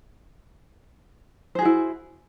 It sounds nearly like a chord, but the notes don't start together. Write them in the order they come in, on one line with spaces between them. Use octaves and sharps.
C5 G#4 F#4 E4